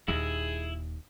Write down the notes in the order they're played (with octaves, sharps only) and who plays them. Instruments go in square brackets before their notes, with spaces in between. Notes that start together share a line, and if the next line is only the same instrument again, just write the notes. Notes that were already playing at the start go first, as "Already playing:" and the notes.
[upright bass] D#1 [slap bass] D#2 [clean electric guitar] E4 [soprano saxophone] G#4